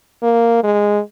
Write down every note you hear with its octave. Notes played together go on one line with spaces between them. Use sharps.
A#3
G#3